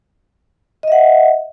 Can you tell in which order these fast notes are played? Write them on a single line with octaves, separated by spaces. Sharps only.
D#5 E5 F#5